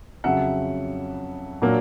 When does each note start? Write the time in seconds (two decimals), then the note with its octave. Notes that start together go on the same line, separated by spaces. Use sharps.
0.24 F2 C#3 F#3 E5 F#5
1.62 A#2 F#3 A#3 D4